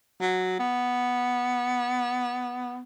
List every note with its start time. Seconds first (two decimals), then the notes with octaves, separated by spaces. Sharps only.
0.21 F#3
0.59 B3